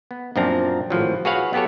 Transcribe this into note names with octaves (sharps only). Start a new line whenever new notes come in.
B3
F#2 A#2 F3 C4 D4 A#5
G#1 A2 F3 F#3
F#4 G#4 B4 C#5 F5 F#5
F#3 B3 G4 A4 C#5